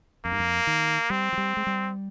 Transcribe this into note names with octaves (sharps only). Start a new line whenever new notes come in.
F2 A#3
G2
F2
D#3
G3 C4
F3
G3
G#3
G3